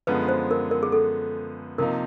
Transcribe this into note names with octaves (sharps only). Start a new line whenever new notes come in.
F#2 D3 F3 G#3 B3 B4
C5
A#4
A#4
G#4
A4
C3 F3 A#3 D#4 A#4